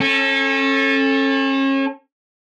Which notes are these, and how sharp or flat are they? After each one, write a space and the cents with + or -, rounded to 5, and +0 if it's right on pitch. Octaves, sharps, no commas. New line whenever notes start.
C#4 -35 A4 +0